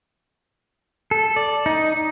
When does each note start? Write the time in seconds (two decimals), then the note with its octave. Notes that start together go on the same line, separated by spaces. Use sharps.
1.11 A4
1.36 D5
1.66 D#4